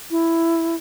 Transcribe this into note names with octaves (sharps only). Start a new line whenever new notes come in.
E4